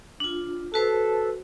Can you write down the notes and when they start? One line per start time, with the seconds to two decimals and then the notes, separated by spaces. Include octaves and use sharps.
0.20 D4 F4
0.74 F#4 A4 B4 C5